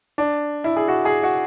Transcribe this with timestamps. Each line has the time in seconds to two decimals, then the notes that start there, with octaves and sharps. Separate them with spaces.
0.18 D4
0.64 E4
0.76 G#4
0.88 F#4
1.05 G#4
1.23 F#4